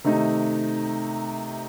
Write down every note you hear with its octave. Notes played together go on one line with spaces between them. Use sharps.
C3 D#3 A3 D#4